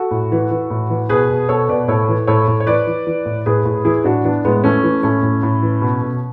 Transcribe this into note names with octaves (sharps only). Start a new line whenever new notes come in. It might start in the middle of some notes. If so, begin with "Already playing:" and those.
Already playing: F#4 A4
A2
E3
E3
A2
E3
B2 G#4 B4
B2
B2 A4 C#5
B2 B4 D5
A2 A4 C#5
E3
A2 A4 C#5
A2
C#5
E3 B4 D5
E3
E3
A2
A2 G#4 B4
A2
E3 E4 G#4
A2 D4 F#4
E3 B3 D4
A2 G#3 B3
E3 A3 C#4
E3
A2 A3 C#4
A2
A2
E3
B2
B2